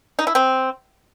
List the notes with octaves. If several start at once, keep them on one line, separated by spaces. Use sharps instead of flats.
D#4
E4
C4